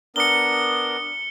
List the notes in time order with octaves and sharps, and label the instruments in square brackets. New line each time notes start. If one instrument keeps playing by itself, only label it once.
[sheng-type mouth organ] B3 D4 A#4 [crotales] C#7 G7